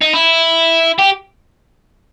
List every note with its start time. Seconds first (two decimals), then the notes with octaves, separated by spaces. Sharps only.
0.01 D#4
0.13 E4
0.99 G4